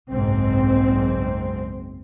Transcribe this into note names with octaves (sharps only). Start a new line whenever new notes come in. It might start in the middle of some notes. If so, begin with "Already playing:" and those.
F#1 B1 G#2 C4